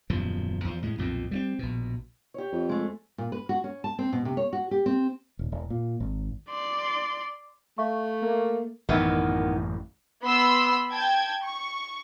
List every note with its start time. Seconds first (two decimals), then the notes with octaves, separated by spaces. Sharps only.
0.10 D#1 F#2 B2 F3
0.65 E2 F3
0.82 A2 G#3
0.98 B1 F2 A#2 C4
1.31 G3 A3 C4
1.59 A#1 B2
2.34 G4 C#5
2.53 F2
2.69 G#3 A3
3.18 A#2
3.32 B4
3.49 F#4
3.64 C#4
3.84 A5
3.99 C4
4.13 B2
4.25 C3
4.37 C#5
4.53 F#4
4.71 G4
4.86 C4
5.39 D#1
5.52 E1
5.70 A#2
6.00 G#1
6.50 D5 C6
7.78 A3 E5 F5 C#6
8.22 A#3
8.89 A1 F#2 D#3 E3 B3
10.23 B3 B5 C6 E6
10.90 G5 A5 G#6
11.41 C#6